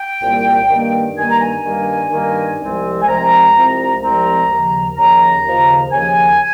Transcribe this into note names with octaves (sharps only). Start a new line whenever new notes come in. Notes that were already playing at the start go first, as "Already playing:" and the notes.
Already playing: G5
C2 A#2 G3 A#3
G2 D#3 G3 A#3
G2 D#3 G3 A#3 G#5
A#5
G#5
G2 D#3 G3 A#3
G2 D#3 G3 A#3
C2 C3 F3 G#3 C4
G#5
C2 C3 F3 G#3 C4 A#5
C2 C3 F3 G#3 C4
C2 C3 F3 G#3 C4 A#5
D#2 C#3 F3
D#2 C#3 F3 A#5
D#2 C#3 F3
D#2 C#3 F3 G#5